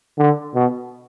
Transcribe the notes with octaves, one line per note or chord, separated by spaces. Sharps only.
D3
B2